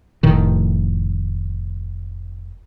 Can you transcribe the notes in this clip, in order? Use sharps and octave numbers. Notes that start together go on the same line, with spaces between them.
F1 A2 D#3